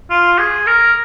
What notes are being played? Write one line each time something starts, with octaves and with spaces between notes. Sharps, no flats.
F4
G#4
A#4